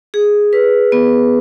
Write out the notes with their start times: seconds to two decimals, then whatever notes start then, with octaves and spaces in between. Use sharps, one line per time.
0.14 G#4
0.53 B4
0.92 B3